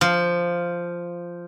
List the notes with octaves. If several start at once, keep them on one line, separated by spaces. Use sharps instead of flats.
F3